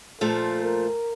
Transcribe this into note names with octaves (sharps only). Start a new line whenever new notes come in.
A#2 F3 A3 A4
A#4